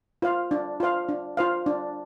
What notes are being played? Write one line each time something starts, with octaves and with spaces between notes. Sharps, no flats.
F4 C5 F5
D4
F4 C5 F5
D4
F4 C5 F5
D4